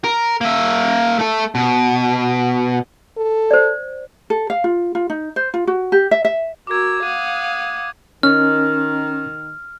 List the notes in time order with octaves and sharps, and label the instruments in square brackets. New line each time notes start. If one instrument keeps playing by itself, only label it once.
[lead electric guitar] A#4
A#3 E5
A3 A4
B2
[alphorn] A4
[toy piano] C5 D5
[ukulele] A4
F5
F4
F4
D#4
C5
F4
F#4
G4
E5
E5
[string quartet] F#4 A#4 E6 [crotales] D6 G#6
[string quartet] F5 F#5 D#6 [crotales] D#7
[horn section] D#3 [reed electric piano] C#4 [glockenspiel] F6